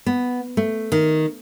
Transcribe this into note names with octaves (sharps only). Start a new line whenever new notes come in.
B3
A3
D#3